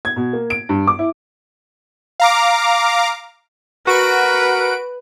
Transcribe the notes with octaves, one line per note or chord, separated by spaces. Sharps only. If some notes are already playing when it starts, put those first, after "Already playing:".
G#6
B2
A#3
D7
G2
D6
E4
F5 A#5 D6
F#4 A#4 B4 D7